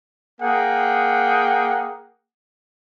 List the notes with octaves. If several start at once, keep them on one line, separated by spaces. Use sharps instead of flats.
A#3 G#4 F#5 G5